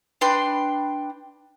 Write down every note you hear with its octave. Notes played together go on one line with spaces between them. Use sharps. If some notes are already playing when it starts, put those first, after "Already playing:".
D4 B4 G5 C6